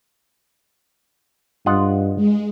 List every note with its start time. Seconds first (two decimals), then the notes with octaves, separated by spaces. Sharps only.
1.66 G2 F4 D#5 F#5
2.16 G#3